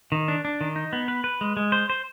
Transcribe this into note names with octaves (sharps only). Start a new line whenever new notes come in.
D#3
D4
D4
D#3
D#4
B3
B4
B4
G#3
G#3
C5
C5